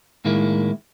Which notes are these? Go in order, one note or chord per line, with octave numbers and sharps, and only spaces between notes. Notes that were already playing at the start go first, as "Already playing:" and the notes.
A2 D#3 G#3 A#3 E4